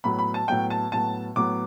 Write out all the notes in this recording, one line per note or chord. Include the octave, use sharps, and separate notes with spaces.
A2 F#3 B3 B5
B5
A5
A2 F#3 B3 G5
A5
A2 F#3 B3 A5
A2 F#3 B3 D6